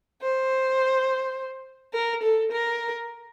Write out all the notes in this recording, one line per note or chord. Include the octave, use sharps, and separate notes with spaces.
C5
A#4
A4
A#4